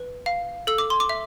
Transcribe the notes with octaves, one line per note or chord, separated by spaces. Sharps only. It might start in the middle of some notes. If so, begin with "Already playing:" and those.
Already playing: B4
F5
A4 E6
D6
C6
D6
E5